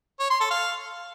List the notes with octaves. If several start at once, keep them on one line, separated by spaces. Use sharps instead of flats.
C#5
C6
A4
F5